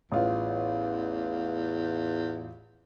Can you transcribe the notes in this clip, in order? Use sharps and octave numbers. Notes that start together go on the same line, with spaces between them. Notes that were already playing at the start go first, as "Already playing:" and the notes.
A1 E2 F4